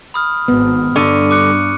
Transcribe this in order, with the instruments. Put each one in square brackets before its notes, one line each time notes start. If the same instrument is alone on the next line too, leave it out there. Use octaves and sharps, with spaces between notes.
[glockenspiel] B5 D#6 F6
[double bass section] G#1 [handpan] B3
[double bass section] G2 [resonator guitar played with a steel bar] D3 [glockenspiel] C#6 C#7 D#7
[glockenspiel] D6 F#6 C#7